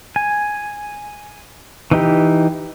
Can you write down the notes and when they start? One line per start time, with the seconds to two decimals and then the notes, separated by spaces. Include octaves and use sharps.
0.16 G#5
1.91 E3 D#4 G4